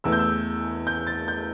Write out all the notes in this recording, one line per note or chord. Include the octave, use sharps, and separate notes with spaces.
E2 E3 A3 E6
G6
E6
G6
A6
G6